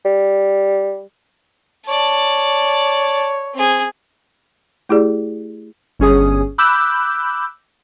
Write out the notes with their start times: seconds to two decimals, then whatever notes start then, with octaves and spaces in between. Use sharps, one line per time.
0.05 G3
1.88 C#5 D5 A5
3.55 C4 G#4
4.89 A3 E4 G4 G#4 D5
5.99 G1 C#4 G#4 D#6
6.58 B5 D6 E6 F#6 G6